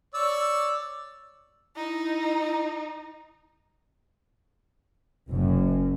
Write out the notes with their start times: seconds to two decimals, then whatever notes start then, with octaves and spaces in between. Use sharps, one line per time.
0.14 C#5 D5 E6
1.76 D#4 E4
5.29 F#1 F#2